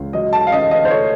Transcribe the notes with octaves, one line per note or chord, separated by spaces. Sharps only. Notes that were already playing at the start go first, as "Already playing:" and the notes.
Already playing: C#2
F#3 D#5
A5
F5
C#4 D#5
D#5
C5
A3 C#5